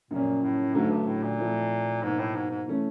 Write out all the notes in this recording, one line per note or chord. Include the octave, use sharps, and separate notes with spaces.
F#2 A#2 C#3 F3 A#3 C#4
A2
G#2 D3 F#3 A3
G2
A2
A#2
F3 A3 C4 E4
G#2 B2 F#3 A#3 D#4
A2
G#2
G#2
E3 A3 C#4